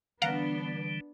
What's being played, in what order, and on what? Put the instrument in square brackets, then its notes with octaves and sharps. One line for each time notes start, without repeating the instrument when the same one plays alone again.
[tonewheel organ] D3 E3 G3 [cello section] B3 D4 [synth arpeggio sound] F5 F#5 A#5